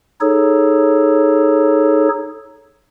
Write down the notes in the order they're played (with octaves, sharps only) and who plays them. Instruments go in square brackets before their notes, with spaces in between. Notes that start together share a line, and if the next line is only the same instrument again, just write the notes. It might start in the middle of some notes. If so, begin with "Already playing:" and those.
[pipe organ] D#4 G#4 A4 C#5